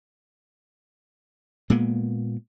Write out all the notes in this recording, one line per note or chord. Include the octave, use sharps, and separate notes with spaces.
A#2 G#3 A#3 B3